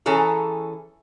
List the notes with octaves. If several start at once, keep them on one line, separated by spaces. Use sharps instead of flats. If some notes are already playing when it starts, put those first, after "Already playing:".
E3 C#4 G#4 A4 A#5